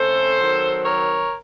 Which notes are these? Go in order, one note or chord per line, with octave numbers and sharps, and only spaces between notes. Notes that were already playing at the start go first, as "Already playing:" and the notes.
Already playing: C#3 A3 C4 A4 C5
D#3 F#3 C4
A#4 C#5